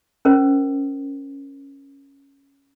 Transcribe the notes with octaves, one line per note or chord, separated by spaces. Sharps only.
C#4 A#4 C5